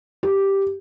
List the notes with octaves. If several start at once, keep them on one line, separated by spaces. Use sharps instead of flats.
G4